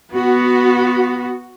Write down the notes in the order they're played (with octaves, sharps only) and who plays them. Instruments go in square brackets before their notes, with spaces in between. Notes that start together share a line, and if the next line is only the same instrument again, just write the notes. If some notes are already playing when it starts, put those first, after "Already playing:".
[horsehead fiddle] B3 [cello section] F#4